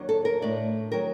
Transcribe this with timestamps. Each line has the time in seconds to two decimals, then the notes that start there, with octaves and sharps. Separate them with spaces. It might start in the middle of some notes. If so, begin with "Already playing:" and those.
Already playing: D#2 D#3 F#3 D4
0.09 A4
0.25 A#4
0.41 A2 A3 D4 D5
0.92 D#3 F#3 C4 A#4